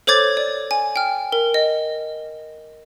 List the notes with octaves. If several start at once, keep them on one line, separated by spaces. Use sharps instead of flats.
A4 C5 C#5 D6 G#6 A6
D5
G#5
G5 F6
A#4
D#5